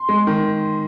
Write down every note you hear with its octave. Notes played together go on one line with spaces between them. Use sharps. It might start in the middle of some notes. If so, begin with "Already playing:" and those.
Already playing: C6
G#3
D#3